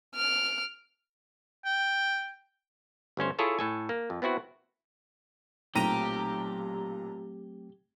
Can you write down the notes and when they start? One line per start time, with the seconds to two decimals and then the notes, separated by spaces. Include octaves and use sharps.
0.16 F6 D7
1.65 G5
3.17 G1 D2 C#4 C5
3.39 E4 F4 G#4 A4 C#5 E5
3.59 A2 A4 G#5
3.89 A#3
4.10 F2
4.22 B3 C4 E4 F#4 F#5
5.75 B1 A#2 F#3 A3 C4 G4 A#5 D#7